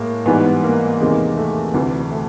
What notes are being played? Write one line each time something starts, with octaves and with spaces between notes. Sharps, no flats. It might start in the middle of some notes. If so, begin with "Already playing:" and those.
Already playing: A2 G#3 A#3
G#2 E3 G3 B3
B3
A#3
E2 C3 D#3 G#3
A3
D2 C3 E3
A3